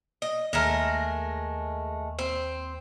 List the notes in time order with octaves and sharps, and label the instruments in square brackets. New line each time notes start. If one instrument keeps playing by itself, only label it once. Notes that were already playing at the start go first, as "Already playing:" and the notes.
[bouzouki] D#5
[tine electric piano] D#2 [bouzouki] G#3 A3 A#4
[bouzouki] C4